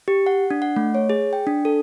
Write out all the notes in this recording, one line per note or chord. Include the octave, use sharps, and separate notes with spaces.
G4
F#5
D4
F#5
A3
C#5
G#4
G5
D4
A4